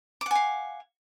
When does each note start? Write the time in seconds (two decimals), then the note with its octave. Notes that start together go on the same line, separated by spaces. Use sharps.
0.21 D6
0.26 F#5
0.31 G#5
0.36 F5